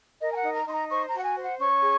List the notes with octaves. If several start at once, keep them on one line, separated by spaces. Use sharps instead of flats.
A#4 D#5
G#5
F#5
D#4
A#5
D#4 C6
A#5
C5 C#6
A#5
F#4 F#5
G#5
C5
F#5
C#4 C#6
G#4